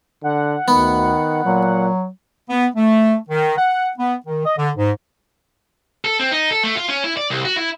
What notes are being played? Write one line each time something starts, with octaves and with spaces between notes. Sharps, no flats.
D3 F#5
D2 D#3 B3
A#2 F#3
B3
A3
D#3
F#5
B3
D#3
D#5
D3
G#2
A4
C4
D#4
A4
A3
F4
C#4
E4
D5
C2
F#4
E4